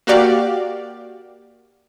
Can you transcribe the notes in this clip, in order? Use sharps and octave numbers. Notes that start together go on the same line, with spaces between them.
A#3 F#4 G4 D5 F5